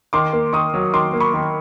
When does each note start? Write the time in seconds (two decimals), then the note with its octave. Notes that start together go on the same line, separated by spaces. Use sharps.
0.13 D#3 C6 D6
0.33 A#3
0.53 D#3 C#6 D#6
0.74 F#3
0.93 D#3 C6 D6
1.13 A#3
1.20 B5 C#6
1.34 D#3